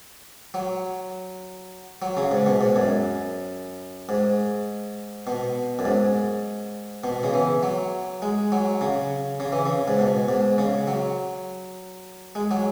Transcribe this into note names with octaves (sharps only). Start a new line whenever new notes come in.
F#3
F#3
C#3
G#2
B2
G#2
F#2
G#2
B2
F#2
G#2
B2
C#3
E3
F#3
G#3
F#3
C#3
C#3
E3
C#3
G#2
B2
G#2
C#3
F#3
G#3
F#3